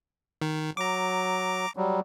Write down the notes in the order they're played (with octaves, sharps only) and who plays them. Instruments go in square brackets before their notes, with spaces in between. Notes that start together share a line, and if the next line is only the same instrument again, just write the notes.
[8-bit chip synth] D#3
[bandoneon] F#3 [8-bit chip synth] A#5 D6
[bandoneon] F#3 G3